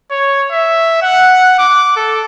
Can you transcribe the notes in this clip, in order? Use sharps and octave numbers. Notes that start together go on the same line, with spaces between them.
C#5
E5
F#5
D6
A4